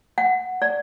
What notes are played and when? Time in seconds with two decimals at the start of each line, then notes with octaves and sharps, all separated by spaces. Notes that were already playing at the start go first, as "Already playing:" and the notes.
0.18 F#5
0.62 D5